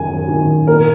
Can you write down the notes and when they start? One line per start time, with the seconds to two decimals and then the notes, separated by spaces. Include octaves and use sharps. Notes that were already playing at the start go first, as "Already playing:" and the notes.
Already playing: F#2 D#3 G#5
0.28 D#3
0.67 A#2 A#4